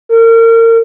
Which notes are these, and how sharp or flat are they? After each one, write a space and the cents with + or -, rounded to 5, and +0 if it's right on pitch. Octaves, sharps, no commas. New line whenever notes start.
A#4 -35